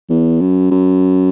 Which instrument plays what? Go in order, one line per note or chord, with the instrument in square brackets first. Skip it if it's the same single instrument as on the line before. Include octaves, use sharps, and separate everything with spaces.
[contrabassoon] E2
F#2
F#2